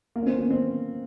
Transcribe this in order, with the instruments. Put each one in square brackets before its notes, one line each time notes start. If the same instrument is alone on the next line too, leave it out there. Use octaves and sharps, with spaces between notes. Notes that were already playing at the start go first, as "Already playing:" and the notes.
[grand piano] A#3
C#4
C4
B3
C4
C4